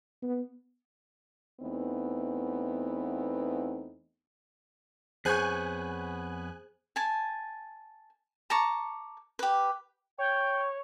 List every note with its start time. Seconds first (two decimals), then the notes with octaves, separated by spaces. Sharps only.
0.23 B3
1.61 E2 A3 B3 C4 D#4
5.25 F2 B3 G#4 C5 C#5 G#5 F#6 G6
6.96 G#5 A5
8.50 A5 A#5 C#6 D6
9.39 G4 B4
10.18 C#5 G5